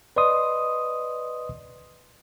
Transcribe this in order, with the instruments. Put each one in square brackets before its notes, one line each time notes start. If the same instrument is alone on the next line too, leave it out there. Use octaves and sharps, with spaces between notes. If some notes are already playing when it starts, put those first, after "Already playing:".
[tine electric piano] B4 D5 D#5 C6 D#6